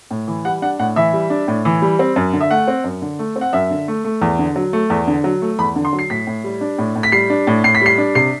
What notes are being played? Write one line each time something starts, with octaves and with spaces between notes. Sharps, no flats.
A2
E3
G3 F#5
D4 F#5
A2 F#5
E3 E5
G3
D4
A2
E3
G3
C4
F#2
D3
E5
A3 F#5
C4
F#2
D3
A3
C4
F#5
F#2 E5
D3
A3
A3
E2
D3
F#3
A3
E2
D3
F#3
A3
E2 B5
D3
C6
F#3
C7
A2 B6
A2
G3
D4
A2
A2
B6
G3 C7
D4
A2
A2 C7
B6
G3 C7
D4
C3 C7